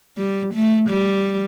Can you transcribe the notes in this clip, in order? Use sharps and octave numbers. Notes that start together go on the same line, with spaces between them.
G3
A3
G3